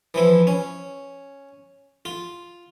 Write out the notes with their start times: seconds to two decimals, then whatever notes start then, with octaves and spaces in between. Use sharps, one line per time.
0.14 E3 F3 E4
0.47 C#4
2.05 F4